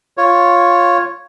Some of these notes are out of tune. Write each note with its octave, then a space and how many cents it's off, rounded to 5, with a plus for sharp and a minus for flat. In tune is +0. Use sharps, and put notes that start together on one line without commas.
F4 +5 C#5 +0